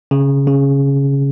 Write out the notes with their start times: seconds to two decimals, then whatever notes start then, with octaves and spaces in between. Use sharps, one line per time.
0.11 C#3
0.47 C#3